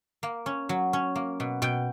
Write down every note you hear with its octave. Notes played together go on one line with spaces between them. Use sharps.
A#3
C#4
F#3
C#4
A#3
B2
B2 G5